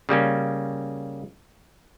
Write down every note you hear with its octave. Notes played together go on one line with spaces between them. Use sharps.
C#3 G3 A#3 C#4